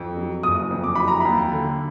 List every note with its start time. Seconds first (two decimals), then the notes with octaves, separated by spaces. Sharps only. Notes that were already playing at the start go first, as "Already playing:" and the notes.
Already playing: F2
0.17 F#3
0.43 F#1 D#6
0.71 F2
0.84 D6
0.95 F#3 B5
1.08 A#5
1.20 D#2 B5
1.52 D3